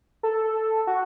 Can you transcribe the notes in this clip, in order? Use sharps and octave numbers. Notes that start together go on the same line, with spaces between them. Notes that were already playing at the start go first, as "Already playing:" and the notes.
A4
F#4